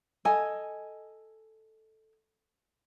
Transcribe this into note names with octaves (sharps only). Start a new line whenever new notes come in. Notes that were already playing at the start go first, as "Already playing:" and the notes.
A4 D#5 G#5